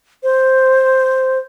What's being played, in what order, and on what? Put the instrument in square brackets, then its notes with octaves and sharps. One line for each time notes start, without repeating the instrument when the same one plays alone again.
[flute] C5